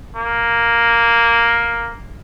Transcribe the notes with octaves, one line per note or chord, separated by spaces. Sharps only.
A#3